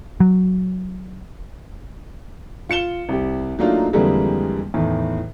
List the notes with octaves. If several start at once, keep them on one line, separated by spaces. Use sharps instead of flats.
F#3
F4 C#7 E7 G7
C2 G4
F#3 A3 A#3 D4 D#4 F4
F2 D3 E3 G3 G#3 A#3
E2 A2 D#3